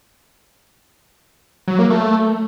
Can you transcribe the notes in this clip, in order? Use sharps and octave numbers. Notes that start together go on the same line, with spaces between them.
F#3
A#3
A3